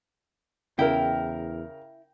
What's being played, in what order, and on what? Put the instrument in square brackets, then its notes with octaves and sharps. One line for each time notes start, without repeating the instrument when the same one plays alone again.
[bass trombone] E2 [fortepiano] C#3 A#4 [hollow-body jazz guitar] E4 [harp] G5